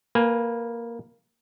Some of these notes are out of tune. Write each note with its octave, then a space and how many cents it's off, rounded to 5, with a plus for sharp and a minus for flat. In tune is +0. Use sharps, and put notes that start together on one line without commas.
A#3 +0 B4 -15 G#5 +0